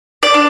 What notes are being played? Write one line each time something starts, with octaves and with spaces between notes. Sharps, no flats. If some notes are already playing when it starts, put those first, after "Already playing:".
D5
D4